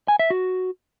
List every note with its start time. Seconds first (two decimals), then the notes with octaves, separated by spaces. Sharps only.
0.08 G#5
0.19 E5
0.30 F#4